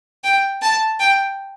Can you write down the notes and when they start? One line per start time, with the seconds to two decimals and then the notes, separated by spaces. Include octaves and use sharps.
0.24 G5
0.62 A5
0.99 G5